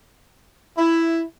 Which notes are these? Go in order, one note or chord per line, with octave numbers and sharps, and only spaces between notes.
E4